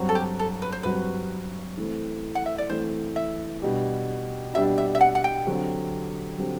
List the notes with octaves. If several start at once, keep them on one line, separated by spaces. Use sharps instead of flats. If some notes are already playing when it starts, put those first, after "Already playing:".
Already playing: G2 F#3 C4 F#4
A4
G4
A4
B4
C5
G2 F#3 C4 F#4 B4
E3 A3 C4
F#5
E5
D5
E3 A3 C4 C5
E5
B2 G3 D4 G4
B2 G3 D4 G4 E5
E5
E5
F#5
F#5
G5
D3 F#3 C4 G4
D3 F#3 C4 G4